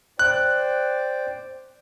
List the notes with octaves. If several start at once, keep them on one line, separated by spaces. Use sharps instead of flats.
C5 D5 G5 F#6